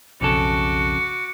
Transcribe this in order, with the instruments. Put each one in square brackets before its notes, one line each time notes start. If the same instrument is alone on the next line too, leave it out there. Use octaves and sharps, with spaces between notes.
[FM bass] B1 [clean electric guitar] F2 C#3 A4 [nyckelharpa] F#4 D6 [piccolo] C#7